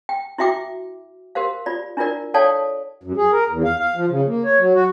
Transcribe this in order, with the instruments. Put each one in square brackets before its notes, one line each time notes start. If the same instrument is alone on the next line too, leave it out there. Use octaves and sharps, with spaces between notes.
[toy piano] G5
E4 F#4 E5 G5 D6
G4 A#4 C5 F5
F4 D5
D4 E4 F4 A#4 D5
A4 C#5 D5 F5 G5 A5
[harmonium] F#2
G#4
A#4
E2
F5
F5
F3
C#3
A#3
C#5
F#3
F#4